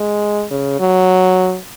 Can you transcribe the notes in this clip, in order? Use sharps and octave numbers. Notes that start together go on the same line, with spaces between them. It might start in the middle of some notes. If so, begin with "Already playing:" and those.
Already playing: G#3
C#3
F#3